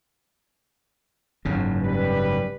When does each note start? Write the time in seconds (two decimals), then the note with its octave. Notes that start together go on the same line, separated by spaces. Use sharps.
1.45 F#1 G#2 C#3
1.82 G3 B4